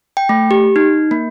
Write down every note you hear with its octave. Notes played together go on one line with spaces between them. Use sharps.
G5
A3
G4
D#4
A#3